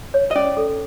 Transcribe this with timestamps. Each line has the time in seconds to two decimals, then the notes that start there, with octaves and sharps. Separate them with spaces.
0.14 C#5
0.31 D#5
0.36 C#4 D5
0.57 A4